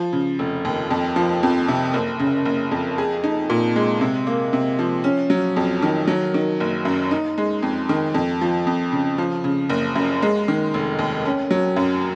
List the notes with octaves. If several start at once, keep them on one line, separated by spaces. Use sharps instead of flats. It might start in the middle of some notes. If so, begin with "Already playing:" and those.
Already playing: F3
C#3
F1
D#2
F2
F3
F2
C3
F#1
C#3
F#1
F2
G#4
D#4
A#2
G#3
C3
A#3
C3
F3
C#4
F#3
F2
D#3
F#3
D#3
F#1
F#2
D#4
G#3
F2
D#3
F2
F3
F2
C#3
F3
C#3
F#1
F#2
G#3
D#3
F1
D#2
C#4
F#3
F#2